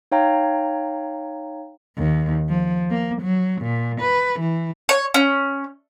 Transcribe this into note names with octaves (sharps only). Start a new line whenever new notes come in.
D#4 C#5 F5 G5 A#5
D#2
F3
A#3
F#3
A#2
B4
E3
C#5
C#4